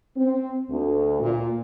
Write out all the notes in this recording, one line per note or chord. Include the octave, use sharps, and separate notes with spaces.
C4
D2
A#2